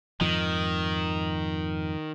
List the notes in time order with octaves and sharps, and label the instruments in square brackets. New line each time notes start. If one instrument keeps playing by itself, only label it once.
[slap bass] F2 G#2 F3 [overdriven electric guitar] D#3